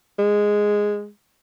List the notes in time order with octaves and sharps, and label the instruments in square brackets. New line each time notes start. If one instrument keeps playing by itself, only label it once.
[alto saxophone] G#3